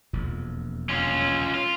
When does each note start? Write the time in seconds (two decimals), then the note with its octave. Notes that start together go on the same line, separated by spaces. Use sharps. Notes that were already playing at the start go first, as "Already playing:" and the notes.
0.13 E1 A#1 F2
0.89 C#4 F4
1.54 F4